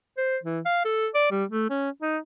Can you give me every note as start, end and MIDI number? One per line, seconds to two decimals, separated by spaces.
0.18 0.37 72
0.43 0.60 52
0.66 0.80 77
0.85 1.08 69
1.15 1.29 74
1.31 1.45 55
1.50 1.68 57
1.70 1.90 61
2.02 2.18 63